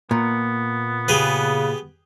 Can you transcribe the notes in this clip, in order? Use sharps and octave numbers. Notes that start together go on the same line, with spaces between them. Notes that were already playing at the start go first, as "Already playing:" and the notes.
A#2 B3
C#3 G4 G#4 B4